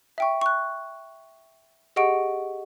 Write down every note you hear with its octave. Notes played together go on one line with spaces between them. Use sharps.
E5 G5 C#6
C#6 F#6
G4 G#4 D#5 F#5 C#6 D7